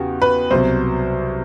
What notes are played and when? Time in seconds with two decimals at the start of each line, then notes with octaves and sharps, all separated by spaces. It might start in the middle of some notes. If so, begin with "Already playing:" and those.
Already playing: E2 C#3 F#4 G4
0.22 B4
0.51 C2 B2 F#3 C5